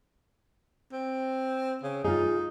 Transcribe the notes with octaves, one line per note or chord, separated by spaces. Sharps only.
C4
C#3
D#4 F4 G#4